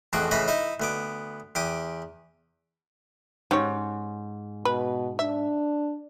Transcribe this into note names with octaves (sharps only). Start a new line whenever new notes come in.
A1 F2 B2 F#4 G#4 G5
A2 C#3 E3 D#5 A#5 B5
D#4 E4 D#5 E5
D2 B3 D6
E2 G4 D6 D#6
G#2 C#4 G4 C#5
B2 B4
D4 E5